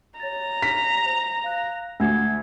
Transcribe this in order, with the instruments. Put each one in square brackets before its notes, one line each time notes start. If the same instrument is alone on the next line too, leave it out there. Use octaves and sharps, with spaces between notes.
[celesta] C#5 A6 [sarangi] A#5
[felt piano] B6
[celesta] C5 F7
F5 F#6 A#6
[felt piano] D2 [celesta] G#5 G#6